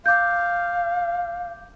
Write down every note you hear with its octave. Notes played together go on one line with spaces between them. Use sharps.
F5 D6 G6